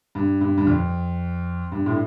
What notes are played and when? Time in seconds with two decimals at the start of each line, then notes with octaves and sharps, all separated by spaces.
0.15 G2
0.41 G2
0.58 G2
0.67 F2
1.72 G2
1.86 A2